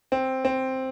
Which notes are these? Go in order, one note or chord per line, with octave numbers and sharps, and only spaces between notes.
C4
C4